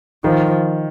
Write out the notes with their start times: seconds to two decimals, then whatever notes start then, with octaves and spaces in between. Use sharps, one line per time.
0.24 D#3 F3